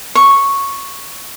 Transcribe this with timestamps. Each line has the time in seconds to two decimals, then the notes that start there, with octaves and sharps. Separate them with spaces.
0.15 C#6